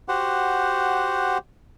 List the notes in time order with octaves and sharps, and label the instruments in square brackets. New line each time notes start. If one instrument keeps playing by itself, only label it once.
[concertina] F#4 G4 C5 F#5